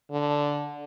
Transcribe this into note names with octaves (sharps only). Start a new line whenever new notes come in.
D3